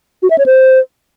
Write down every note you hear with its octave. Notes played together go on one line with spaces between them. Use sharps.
F#4
E5
C#5
C5